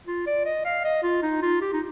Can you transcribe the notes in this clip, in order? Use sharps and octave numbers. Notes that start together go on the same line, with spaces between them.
F4
D5
D#5
F5
D#5
F4
D#4
F4
G4
D#4